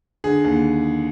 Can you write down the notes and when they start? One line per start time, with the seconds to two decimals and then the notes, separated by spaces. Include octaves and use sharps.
0.24 D3 G#4
0.45 D#2